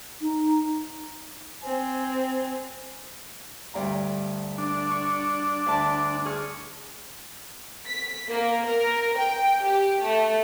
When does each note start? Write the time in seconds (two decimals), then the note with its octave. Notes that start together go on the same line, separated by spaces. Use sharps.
0.21 D#4
1.63 C4 G#5
3.74 D2 G2 A#5
4.58 D4
4.90 C#6
5.66 D2 A5 C6
6.25 G#4 C#6 F6
7.86 B6
8.29 A#3
8.67 A#4
9.18 G5
9.62 G4
10.03 A3